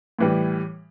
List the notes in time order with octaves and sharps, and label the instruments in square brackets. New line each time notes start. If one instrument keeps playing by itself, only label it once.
[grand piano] A2 E3 G3